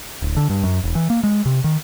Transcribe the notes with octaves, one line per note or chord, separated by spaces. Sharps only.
D1
D3
G2
F#2
E1
E3
A#3
G#3
C3
D#3